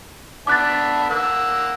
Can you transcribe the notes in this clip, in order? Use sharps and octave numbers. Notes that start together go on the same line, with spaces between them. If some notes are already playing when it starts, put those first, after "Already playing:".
B3 D4 E5 D6 F#6 A6
A#3 F#5 E6